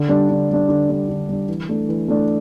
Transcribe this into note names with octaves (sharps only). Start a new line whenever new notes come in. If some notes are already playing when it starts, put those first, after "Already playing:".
Already playing: D3
G3 D4
D3
G3 D4
D3
G3 D4
D3
G3 D4
E3
A3 D4
E3
A3 D4